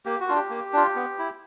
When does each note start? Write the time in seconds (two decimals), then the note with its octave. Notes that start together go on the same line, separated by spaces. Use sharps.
0.06 A#3 G4
0.20 F#4
0.28 D4 F4
0.36 G4
0.50 A#3
0.73 D4 F4
0.96 B3
1.18 E4